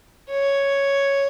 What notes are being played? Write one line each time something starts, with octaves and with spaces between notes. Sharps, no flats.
C#5